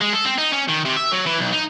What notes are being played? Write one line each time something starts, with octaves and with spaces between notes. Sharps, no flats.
G#3
A4
C4
D#4
C#4
D#3
C3
E5
F#3
E3
B1
D#4